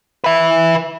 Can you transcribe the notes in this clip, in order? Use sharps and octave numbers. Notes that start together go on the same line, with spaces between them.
B4 E5